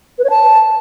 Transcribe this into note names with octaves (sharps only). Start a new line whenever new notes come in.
B4
C#5
A5